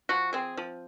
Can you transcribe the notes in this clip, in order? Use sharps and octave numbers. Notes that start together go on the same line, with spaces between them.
F3 F#4
C4 G#4
F3